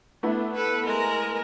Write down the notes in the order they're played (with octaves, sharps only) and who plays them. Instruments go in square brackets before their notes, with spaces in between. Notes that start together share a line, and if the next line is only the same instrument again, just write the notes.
[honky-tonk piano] A3 B3 E4 [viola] D4
[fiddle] A4 [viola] B4
[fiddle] G#3 [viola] A#4